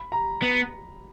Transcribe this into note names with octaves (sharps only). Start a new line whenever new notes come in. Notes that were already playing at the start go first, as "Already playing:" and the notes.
Already playing: B5
A#5
B3